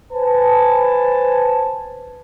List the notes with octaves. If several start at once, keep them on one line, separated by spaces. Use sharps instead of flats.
B4 C5 G#5 A5